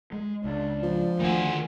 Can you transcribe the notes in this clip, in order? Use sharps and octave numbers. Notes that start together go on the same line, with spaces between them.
G#3
C#2 D4
F3
D2 D#3 A3 F#5 G#5